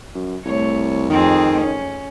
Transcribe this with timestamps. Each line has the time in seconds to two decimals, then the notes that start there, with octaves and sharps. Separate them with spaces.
0.15 F#2
0.46 C2 A3 C#5
1.10 F2 D#3 C4 G#4
1.60 C#4